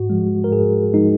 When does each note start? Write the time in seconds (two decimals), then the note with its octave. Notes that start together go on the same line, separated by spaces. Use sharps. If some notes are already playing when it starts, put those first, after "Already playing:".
Already playing: G#2 F#4
0.10 F3 G#3
0.44 A#4
0.52 G#2 G#4
0.94 F3 G#3 D#4